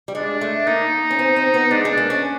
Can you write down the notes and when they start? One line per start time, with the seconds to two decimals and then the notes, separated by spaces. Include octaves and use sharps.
0.08 G3
0.15 G#3 D4
0.41 A3
0.67 A#3 D#4
1.11 C#4
1.19 C4
1.36 C4
1.54 B3
1.71 G#3 D4
1.85 G#3
1.97 A#3
2.10 C#4